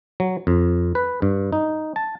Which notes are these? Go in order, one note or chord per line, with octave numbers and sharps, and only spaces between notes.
F#3
F2
B4
G2
D#4
A5